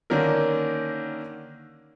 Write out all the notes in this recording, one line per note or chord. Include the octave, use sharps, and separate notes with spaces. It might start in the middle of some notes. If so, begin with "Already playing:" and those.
D3 D#3 A#3 C#4 D4 A#4